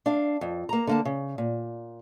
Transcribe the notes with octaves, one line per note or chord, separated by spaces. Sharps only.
D4 F5
F2
A#3 A#5
D3 A#3 A5
C#3
A#2